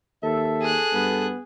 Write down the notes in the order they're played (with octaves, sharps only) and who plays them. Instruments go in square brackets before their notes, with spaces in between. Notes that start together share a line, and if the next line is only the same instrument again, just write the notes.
[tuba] D#2 [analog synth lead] A4 [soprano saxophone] E5
[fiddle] G#4 F#6
[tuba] G2 [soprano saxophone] B3